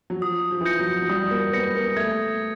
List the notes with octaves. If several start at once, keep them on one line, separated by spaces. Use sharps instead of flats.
F#3
F3 D#6
F3
E3
F3 G6 A#6 C#7
F#3
F#3
G3 D#6
A#3
B3 G6 A#6 C#7
A#3
A3 G#6